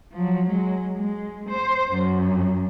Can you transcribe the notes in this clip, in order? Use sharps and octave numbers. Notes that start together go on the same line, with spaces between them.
F3 F#3
F#3 G#3
G#3
C5
F#2